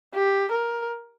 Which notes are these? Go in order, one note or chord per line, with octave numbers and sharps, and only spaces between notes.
G4
A#4